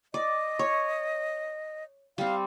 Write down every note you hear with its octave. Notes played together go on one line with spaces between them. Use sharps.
D5 D#5
C#5
G3 C4 F5